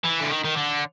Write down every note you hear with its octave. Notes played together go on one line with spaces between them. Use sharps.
E3
D3
D#3
D#3
D3